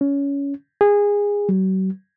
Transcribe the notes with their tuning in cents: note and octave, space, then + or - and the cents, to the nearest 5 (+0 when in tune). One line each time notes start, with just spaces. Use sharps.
C#4 +20
G#4 -20
F#3 +40